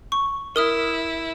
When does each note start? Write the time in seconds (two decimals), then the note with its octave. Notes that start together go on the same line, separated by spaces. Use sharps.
0.12 C#6
0.56 E4 A#4 D#6 F6